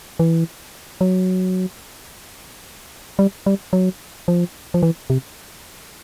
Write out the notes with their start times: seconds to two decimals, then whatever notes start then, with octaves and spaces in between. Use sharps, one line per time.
0.19 E3
1.01 F#3
3.19 G3
3.46 G3
3.73 F#3
4.28 F3
4.74 F3
4.83 E3
5.10 C3